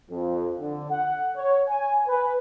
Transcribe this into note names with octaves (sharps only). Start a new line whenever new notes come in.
F2
D3
F#5
C#5
G#5
B4